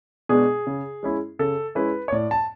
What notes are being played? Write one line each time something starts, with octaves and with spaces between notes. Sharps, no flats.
B2 G#3 D4 G#4
C#3
G#3 C#4 E4
C#3 A4
G#3 C#4 E4 B4
C#5
A2 D5
A5